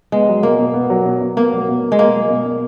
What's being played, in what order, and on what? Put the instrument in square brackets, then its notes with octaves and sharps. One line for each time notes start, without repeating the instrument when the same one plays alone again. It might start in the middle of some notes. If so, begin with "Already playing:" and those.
[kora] G#3 [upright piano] B3
[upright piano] F#3
[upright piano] B2 [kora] A#3
[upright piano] B2
B3
F#3
B2
B2
[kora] A#3 [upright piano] B3
[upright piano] F#3
B2
B2
[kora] G#3
[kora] A#3 [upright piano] B3
[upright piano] F#3
B2
B2